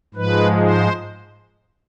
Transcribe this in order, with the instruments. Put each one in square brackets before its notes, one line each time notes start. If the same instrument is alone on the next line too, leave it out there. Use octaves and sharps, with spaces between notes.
[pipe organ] G#2 F3 G#3 B4
C5